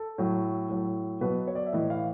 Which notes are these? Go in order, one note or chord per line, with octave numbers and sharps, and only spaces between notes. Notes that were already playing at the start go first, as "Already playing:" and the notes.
Already playing: A4
A2 F#3
A2 F#3
B2 F#3 B4
C#5
D5
E5
A2 E3 D#5
F5